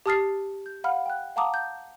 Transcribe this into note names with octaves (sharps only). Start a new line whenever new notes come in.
G4 A5 D#6 F6 A6 C7
G6
F5 F#5 B5 F6
G5 F#6
F5 F#5 A5 A#5 D6 D#6
G6